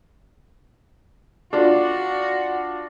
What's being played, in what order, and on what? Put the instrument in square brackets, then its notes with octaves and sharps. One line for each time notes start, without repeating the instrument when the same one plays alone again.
[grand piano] D4 F4 [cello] F#4